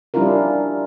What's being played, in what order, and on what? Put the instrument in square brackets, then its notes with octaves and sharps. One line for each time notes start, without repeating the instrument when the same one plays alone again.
[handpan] G3 C#4 D4 E4 F4 A#4